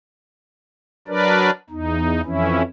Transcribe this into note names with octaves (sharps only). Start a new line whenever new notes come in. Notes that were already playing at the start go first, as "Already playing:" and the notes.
F#3 D4 A#4 B4 D5
E2 D#4
F2 E3 C#4 E4